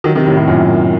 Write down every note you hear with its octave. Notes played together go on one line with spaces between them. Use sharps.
D#3 F#3
C3 D#3
A2 C3
A2 C3
F#2 A#2